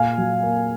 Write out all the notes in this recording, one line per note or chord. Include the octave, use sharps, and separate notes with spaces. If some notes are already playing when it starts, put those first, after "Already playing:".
Already playing: A#2 F5 G#5
F#3
A#3